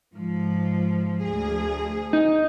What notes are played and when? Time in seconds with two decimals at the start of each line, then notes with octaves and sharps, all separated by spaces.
0.14 G#2 F3
1.24 D2 G#4
2.13 D#4